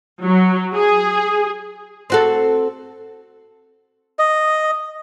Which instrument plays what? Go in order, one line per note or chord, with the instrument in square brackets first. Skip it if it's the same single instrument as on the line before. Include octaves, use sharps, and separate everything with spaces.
[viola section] F#3
G#4
[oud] C4 F#4 A4
[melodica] D#5